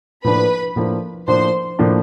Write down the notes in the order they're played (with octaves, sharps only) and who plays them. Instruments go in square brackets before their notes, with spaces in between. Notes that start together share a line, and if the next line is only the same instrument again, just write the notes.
[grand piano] A2 F3 A#3 D4 [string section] B4 B5
[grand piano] A2 F3 A#3 D4
[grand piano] A2 F3 A#3 D4 [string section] C5 C6
[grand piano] A2 F3 A#3 D4